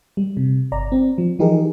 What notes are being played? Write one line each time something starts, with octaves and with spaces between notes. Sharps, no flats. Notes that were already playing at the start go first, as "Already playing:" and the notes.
G3
C3
G1 D5 A#5
C4
F3
E3 F3 D#4 G4 G#4 A#4